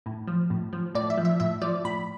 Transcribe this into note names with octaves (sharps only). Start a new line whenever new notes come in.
A2
F3
A2
F3
A2 D5
E5
F3
E5
A2 E5
F3 D5
A2 B5